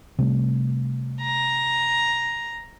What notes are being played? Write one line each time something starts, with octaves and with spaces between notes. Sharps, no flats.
C3 G3 A3
A#5